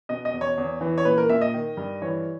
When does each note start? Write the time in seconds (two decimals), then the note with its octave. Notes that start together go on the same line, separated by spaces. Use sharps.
0.09 B2 D#5
0.25 D#5
0.34 E2
0.41 C#5
0.58 E2
0.81 E3
0.98 C#5
1.05 A#2 B4
1.18 A#4
1.29 A#2 E5
1.41 D#5
1.54 D#3
1.77 G2
2.02 E3 C#5